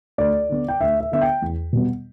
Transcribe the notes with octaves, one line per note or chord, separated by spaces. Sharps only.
D2 D5
D3 B3
G5
D2 E5
E5
D3 B3 E5
G5
E2
B2 G3 B3